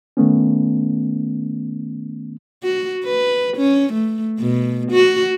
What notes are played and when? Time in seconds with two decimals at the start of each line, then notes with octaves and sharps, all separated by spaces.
0.17 D#3 A3 B3 C#4
2.63 F#4
3.04 B4
3.57 C#4
3.93 A3
4.40 B2
4.91 F#4